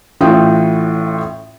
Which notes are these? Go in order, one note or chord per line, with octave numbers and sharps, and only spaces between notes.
A1 A2 F4 G5 D#6